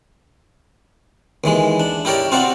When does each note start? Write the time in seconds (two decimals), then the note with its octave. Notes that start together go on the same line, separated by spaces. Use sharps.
1.44 D#2 E3 G#3
1.80 D4
2.05 E4 G4 A#4 C#5 D5
2.32 C4 F4 F#4 D5 F#5